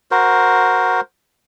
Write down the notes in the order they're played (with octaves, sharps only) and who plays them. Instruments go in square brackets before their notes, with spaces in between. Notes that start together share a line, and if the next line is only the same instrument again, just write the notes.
[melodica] F#4 A#4 C5